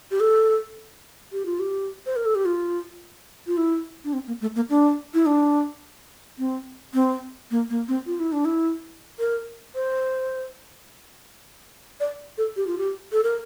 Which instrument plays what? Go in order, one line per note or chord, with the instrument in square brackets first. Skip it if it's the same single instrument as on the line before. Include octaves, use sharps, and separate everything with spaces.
[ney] G4
A4
G4
F4
G4
C5
A#4
A4
G4
F4
F4
E4
D4
C4
A#3
A3
A#3
D4
E4
D4
C4
C4
A#3
A#3
C4
F4
E4
D4
E4
A#4
C5
D5
A4
G4
F4
G4
A4
A#4